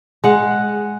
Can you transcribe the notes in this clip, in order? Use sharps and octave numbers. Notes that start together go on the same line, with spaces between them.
G#3 F#5